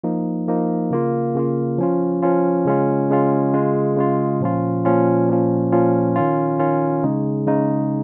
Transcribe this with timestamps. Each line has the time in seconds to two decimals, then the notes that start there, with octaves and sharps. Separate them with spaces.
0.04 F3 A#3 D#4
0.48 F3 A#3 D#4
0.91 C#3 A#3 F4
1.35 C#3 A#3 F4
1.78 F3 C#4 F4
2.22 F3 C#4 F4
2.66 C#3 G#3 C#4 F4
3.10 C#3 G#3 C#4 F4
3.53 C#3 G#3 F4
3.97 C#3 G#3 F4
4.41 A#2 F3 C#4 F4
4.85 A#2 F3 C#4 F4
5.29 A#2 F3 C#4 F4
5.72 A#2 F3 C#4 F4
6.16 D#3 C#4 F4
6.59 D#3 C#4 F4
7.03 C#3 G#3 D#4
7.47 C#3 G#3 D#4